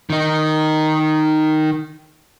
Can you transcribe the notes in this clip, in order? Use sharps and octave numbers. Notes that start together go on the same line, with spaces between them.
D#3 D#4